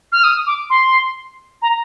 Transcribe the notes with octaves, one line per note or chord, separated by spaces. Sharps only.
F6
D#6
D6
C6
A#5